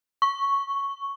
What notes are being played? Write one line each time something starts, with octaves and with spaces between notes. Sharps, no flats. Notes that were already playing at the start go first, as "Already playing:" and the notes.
C#6